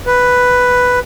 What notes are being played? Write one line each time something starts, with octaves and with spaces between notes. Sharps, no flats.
B4